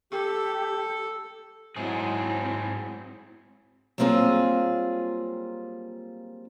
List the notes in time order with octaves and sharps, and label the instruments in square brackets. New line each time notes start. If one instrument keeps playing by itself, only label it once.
[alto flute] G4 [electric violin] A4
[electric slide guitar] G#2 A3 G#4 [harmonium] F#3 [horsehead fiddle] C4 E4
[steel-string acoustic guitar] F#3 G3 A#3 C4 F4 G#4